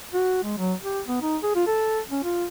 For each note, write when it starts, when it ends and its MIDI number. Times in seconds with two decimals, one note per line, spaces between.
0.14 0.38 66
0.44 0.58 56
0.58 0.73 54
0.82 1.01 67
1.08 1.19 59
1.22 1.37 63
1.43 1.52 68
1.55 1.63 65
1.67 2.00 69
2.11 2.23 61
2.24 2.45 65